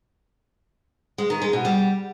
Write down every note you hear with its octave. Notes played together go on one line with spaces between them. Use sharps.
G#3
D#3
G#3
B2
G3